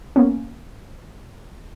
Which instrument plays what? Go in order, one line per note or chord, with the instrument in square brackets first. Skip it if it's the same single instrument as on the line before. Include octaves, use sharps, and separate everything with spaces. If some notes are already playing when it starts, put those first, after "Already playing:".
[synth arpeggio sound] A#3 B3 C#4